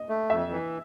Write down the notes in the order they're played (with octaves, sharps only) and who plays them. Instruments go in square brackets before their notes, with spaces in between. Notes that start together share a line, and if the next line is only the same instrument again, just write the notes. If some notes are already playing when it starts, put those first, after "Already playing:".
Already playing: [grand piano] D#5
[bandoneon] A3
[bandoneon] F2 [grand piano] E5
[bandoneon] E3